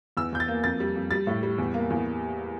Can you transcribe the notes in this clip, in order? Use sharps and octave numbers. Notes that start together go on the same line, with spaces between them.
E2 E6
E2 G6
A6
A#3
F2 A6
G3
F2
G3 A6
A2
G3
E2
A#3
E2